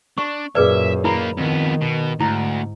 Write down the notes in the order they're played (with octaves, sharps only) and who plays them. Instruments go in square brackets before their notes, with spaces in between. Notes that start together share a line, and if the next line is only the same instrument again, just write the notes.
[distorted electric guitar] D4 [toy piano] C#6
[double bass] F#2 A#2 [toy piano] G#4 B4 D5 [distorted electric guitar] E5
[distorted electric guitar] D#3 A#3 [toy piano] E4 B5
[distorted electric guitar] F2 B3 [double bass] D#3
[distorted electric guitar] B2
[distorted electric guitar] D2 [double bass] G#2 [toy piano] E4